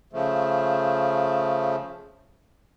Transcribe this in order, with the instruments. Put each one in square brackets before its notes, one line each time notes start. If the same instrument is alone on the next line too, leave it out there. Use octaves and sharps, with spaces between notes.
[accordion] C#3 F3 A3